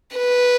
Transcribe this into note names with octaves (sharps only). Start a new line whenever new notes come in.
B4